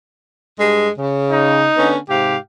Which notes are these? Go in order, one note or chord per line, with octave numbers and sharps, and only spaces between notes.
G2 G#3
C#3
D#4
D3 B3 C#4
G#2 C3 G4 F5